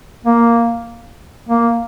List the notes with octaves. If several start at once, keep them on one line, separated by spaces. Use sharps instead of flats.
A#3
A#3